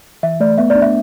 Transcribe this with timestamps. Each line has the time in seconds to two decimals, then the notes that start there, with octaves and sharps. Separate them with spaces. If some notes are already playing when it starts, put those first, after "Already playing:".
0.23 E3 E5
0.40 A3 D5
0.58 B3 E5
0.70 D5
0.75 D4
0.82 E5